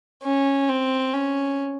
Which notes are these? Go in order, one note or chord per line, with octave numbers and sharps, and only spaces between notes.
C#4
C4
C#4